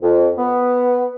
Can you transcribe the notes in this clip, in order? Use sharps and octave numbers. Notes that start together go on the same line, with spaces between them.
F2
B3